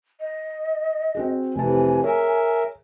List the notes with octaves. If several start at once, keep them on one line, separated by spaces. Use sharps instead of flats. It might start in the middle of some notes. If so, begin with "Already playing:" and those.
D#5
C4 F#4 G#4
F1 C3 E3 G#5 A5
G#4 A#4 C#5 E5